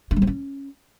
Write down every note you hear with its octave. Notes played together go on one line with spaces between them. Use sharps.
D4
G3
C4
C#4